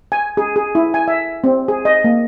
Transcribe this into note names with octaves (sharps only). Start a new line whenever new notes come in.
G#5
G#4
G#4
E4
G#5
E5
C4
G#4
D#5
A#3